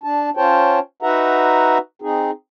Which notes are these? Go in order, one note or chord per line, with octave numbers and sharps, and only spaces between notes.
D4 A5
C#4 F4 C5 C#5 G5 A5
D#4 F#4 B4 E5 F#5 A#5
C4 D#4 G#4